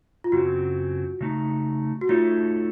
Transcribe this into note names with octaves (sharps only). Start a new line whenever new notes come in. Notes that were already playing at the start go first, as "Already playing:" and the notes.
F4
F#2 C#3 F#3 C4 F#4
C#3 A3 D#4
F#4
A3 D#4 F4 A4 C#5